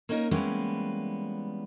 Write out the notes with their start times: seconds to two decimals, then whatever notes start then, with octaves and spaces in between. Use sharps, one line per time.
0.09 A#3 C#4 D#4 A4 A#4
0.31 E3 G3 G#3 A#3 B3 C#4